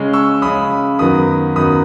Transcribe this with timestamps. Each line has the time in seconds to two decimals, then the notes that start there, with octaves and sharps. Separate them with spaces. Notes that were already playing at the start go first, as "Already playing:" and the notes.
Already playing: C#3 G#3 C#4
0.13 C#6 E6
0.42 C#3 G#3 C#4 B5 D#6
0.99 F#2 D#3 F#3 B3 B5 D#6
1.55 F#2 D#3 F#3 B3 B5 D#6